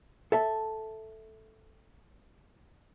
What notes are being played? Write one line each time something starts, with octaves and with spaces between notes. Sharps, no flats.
A4 E5 A5